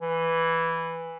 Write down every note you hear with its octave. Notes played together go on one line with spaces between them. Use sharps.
E3